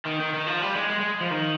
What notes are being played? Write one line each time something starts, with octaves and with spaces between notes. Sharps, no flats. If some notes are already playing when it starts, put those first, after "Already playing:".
D#3
D#3
D#3
F3
G3
G#3
G#3
G#3
F3
D#3